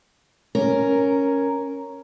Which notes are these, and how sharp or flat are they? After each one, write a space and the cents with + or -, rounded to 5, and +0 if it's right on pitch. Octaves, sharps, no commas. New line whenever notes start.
C#4 +0 A#4 +0